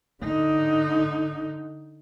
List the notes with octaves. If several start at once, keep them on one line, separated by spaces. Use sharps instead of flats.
D3 D#4